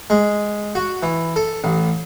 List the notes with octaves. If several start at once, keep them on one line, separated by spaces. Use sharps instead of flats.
G#3
F#4
E3
A4
A1